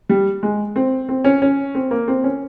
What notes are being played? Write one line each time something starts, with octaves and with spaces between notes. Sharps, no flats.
G3
G#3
C4
C4
C#4
C#4
C4
A#3
C4
C#4